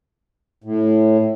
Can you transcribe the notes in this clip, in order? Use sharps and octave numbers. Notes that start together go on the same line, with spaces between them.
A2